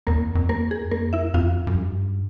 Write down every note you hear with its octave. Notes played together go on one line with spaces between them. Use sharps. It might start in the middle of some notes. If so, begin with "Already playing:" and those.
E2 A#3 A#4
F2
F2
E2 A#3 A#4
G#4
F#2
F2 A#3 A#4
E4 E5
F2 F4 F5
F#2
G2